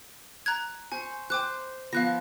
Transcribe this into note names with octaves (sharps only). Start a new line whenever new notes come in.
A#5 F#6 G#6
C5 G#5 C#6
C5 G5 D6 F#6
F3 B3 F5 F#6 A#6